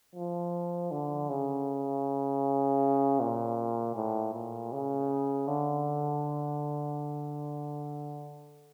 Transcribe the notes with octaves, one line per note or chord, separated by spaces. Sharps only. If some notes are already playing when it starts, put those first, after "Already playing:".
F3
D3
C#3
A#2
A2
A#2
C#3
D3